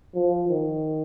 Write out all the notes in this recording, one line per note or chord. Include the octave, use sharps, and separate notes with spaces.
F3
D#3